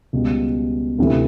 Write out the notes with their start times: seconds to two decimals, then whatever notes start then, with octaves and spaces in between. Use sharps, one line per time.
0.13 C#2 B2 G3
0.99 D2 C3 E3 A3